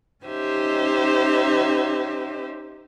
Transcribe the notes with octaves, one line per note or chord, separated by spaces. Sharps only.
C#4 D#4 G4 C5 D#5 E5